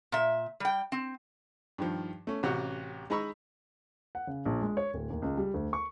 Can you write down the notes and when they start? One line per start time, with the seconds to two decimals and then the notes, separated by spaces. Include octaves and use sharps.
0.12 A#2 E5
0.60 G3 G5
0.92 C4
1.78 G2 D#3 F3
2.27 A3 C#4
2.43 A1 C3 C#4 F#4 F#5
3.10 G#3 D#4 A#5 B5 C#6 E6
4.15 F#5
4.27 C#3
4.45 A#1
4.61 G#3
4.77 C#5
4.94 D1
5.10 D#2
5.22 C#2
5.38 G3
5.54 D2
5.73 C#6